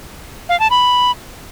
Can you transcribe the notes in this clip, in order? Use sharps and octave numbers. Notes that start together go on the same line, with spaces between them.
F5
A5
B5